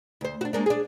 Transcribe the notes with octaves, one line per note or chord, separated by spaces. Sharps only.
D2 C5
D4 F#4
G#3 A#3 D4
D4 G#4